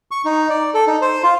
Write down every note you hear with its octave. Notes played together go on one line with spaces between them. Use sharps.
C#6
D#4
D5
A4
D#4
C5
F4